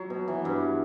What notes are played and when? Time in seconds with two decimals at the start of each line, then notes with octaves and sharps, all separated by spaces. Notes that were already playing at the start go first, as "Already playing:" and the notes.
Already playing: F#3
0.10 B2
0.28 E3
0.45 G2